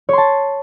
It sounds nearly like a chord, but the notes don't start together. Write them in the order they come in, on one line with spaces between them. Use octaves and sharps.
C#5 C6 A5